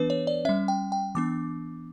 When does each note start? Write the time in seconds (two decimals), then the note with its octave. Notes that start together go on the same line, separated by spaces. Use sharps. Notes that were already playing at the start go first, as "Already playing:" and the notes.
Already playing: E3 B3 D4 B4
0.10 C#5
0.27 D5
0.45 C#4 E5
0.49 G3
0.68 G5
0.92 G5
1.15 E3 B3 D4 D6